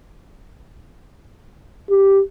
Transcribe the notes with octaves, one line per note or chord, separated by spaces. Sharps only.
G4